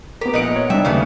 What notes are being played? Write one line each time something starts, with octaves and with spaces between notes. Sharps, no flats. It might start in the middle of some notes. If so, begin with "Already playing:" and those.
B3 G4 A#4
A#1 A#2 D#4 F#5 D7
C#5
C3 G3 D4 D#4 E5 G5
D#2 C#3 E3 A3 B3